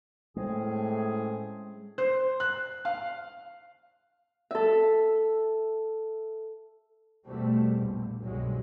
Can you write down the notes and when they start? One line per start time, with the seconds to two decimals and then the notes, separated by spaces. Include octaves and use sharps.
0.36 A2 G#3 C4 C#4 G#4
1.98 C5
2.40 F#6
2.85 F5
4.51 A4 E5
7.27 E2 B2 G3 A3 C4
7.74 A#1
8.23 C2 G2 B2 D#3 F#3 G#3